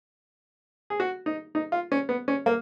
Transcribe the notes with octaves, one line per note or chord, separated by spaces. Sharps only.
G#4
F#4
D#4
D#4
F4
C#4
B3
C#4
A#3